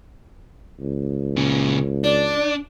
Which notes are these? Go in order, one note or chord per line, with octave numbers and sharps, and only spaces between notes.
C#2
A#2 C#3
D4 D5